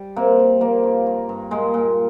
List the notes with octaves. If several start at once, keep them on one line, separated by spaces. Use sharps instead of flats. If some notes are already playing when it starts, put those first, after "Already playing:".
Already playing: G3
C3 A#3
G3
F3 A#3
G2
G2
G2
A#2 G#3
A#2